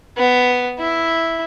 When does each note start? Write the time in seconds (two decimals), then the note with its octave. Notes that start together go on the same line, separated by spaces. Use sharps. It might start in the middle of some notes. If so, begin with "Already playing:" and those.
0.17 B3
0.79 E4